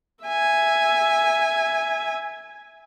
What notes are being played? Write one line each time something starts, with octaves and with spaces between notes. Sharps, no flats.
E5 G#5